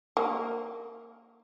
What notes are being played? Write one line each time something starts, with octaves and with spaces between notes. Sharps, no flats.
A#3